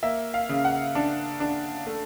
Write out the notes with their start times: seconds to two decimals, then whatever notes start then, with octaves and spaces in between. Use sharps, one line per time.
0.03 A#3 E5
0.34 F5
0.49 C#3
0.65 F#5
0.95 D4
1.40 D4
1.87 A3